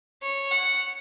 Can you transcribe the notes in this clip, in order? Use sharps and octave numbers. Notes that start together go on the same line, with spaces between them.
C#5
F#5